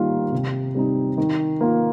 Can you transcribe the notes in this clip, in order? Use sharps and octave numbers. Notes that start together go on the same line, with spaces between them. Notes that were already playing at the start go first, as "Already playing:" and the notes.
Already playing: D#3 G3 A#3 F4
C3
G3 C4 D#4
D#3
A#3 F4